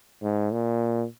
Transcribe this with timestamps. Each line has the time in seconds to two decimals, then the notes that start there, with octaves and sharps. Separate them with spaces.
0.22 G#2
0.52 A#2